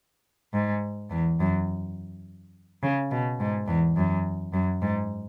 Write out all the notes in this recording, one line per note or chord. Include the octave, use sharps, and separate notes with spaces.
G#2
E2
F#2
C#3
B2
G#2
E2
F#2
F#2
G#2